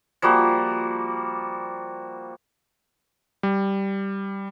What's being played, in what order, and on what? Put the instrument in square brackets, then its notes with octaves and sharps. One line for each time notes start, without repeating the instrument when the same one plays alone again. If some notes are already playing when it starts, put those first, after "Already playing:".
[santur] F3 G3 A#3 F#4
[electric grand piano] G3